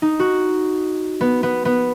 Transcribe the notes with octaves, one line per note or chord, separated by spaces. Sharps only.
D#4
F#4
B3
B3
B3